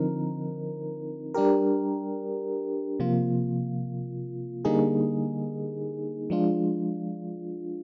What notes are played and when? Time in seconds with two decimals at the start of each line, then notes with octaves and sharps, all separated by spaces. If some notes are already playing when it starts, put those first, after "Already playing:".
Already playing: D3 F3 C4 D#4 A#4
1.34 G3 D4 G4 A#4
3.00 C3 F3 A#3 F4
4.65 D3 G3 A#3 D#4 G#4
6.30 F3 G#3 D4 F4